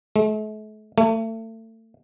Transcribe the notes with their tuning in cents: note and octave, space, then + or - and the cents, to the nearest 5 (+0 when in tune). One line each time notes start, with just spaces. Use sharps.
A3 -45
A3 +30